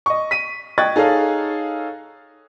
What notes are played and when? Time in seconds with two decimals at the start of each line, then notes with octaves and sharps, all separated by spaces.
0.06 D#5 C#6
0.31 B6 D#7
0.78 D#5 G5 C#6 F#6 G#6 A6
0.96 D#4 G#4 A4 C#5 F5